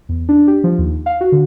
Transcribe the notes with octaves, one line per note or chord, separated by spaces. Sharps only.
E2
D4
G4
F3
D#2
F5
F#4
D3